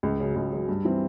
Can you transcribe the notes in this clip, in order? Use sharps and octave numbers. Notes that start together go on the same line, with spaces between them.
C#2
C#3 F#3
C#2
C#3 F#3
G2
E3 G3 C4